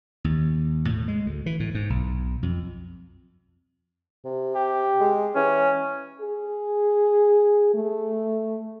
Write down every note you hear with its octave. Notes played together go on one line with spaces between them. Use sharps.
D#2
A2
G#3
D2
E3
A2
G#2
B1
F2
C3
G4
G#3
E3 C#4
G#4
A3